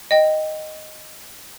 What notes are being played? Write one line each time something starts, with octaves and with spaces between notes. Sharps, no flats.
D#5 G5